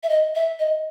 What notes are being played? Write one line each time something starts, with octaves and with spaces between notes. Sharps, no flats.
E5
D#5
E5
D#5